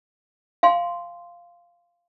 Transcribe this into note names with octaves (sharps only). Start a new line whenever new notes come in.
F5 G#5 C6